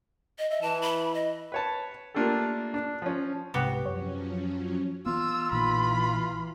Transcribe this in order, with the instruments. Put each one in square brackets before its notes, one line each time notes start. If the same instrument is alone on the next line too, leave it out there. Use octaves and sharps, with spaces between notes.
[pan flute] D#5
[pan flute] D#5 [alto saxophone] E5
[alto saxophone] E3 [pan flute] A5
[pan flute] B5
D#5
[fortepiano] B4 C#5 A5
A3 A#3 D4 F4 G4 A4
D4
F3 C#4
[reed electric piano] C2 G#2 C3 [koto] B3 F#4 G4
[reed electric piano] F#2 C#5 [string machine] F3 F#3 C#4
[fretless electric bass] E3 B3 [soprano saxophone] F4 [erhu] E6
[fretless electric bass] A#1 A#2 D#3 [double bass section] E3 [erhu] B5